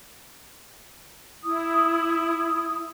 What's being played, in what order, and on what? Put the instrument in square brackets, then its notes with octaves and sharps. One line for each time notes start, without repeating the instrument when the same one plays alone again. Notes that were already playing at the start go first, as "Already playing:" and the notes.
[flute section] E4 D#6